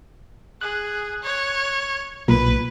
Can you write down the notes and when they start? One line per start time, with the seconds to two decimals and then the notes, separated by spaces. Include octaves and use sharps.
0.61 G#4 F#6
1.23 C#5
2.28 B1 A#2 B4